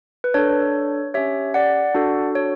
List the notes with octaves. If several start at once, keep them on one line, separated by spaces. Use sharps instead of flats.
B4
D4 A4 C#5
C#4 G4 C#5 E5
D5 F#5
D4 F#4 A4
C#5